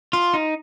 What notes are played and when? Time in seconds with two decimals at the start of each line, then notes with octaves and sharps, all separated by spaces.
0.13 F4
0.34 D#4